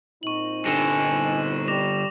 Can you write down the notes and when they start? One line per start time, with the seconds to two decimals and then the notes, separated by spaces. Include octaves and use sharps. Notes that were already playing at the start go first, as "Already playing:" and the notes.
0.23 A#2 C4 D#4 C#6 F#7
0.65 G2 D3 G#5 A#6 E7
1.68 G3 D6 A#6 F7